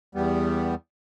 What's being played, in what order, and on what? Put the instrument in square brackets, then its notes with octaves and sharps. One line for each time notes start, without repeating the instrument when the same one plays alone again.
[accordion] E2 G3 B3